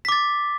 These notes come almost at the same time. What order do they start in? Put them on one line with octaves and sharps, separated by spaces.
B6 D6 A6